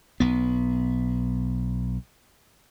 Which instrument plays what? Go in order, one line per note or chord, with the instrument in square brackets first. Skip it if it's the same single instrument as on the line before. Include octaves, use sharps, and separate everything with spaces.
[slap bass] B1 B3